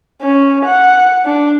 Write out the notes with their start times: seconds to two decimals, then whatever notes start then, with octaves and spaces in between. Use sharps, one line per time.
0.22 C#4
0.66 F#5
1.26 D4